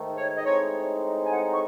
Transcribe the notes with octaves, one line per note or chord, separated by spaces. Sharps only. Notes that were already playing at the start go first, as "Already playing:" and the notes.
Already playing: G#2 D#3 A3
C#5
D#5
A2 G#3 C4 D#4 C#5
G#5
F#5
C#6